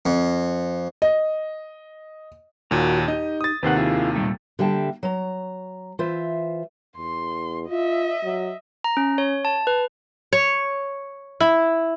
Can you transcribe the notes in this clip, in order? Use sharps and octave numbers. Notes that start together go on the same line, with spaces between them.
F2
D#5
D#2 A#2 F#4 A#5
D#4 G4 D#5
D#6 A6
D#2 C3 D#3 B4 C5 F#5
E4 F4 G#4
A#2 G3 A3
D3 G3 A#3 E5 G5 A5
F#3 A#5
E3 F4 C5 E5
E2 C6
F4 D#5 E5
F#3
A#5
C#4
C#5
A5
B4
C#5
E4